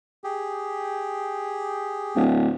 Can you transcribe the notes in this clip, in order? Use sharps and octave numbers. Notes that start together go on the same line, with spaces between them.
G4 G#4
D1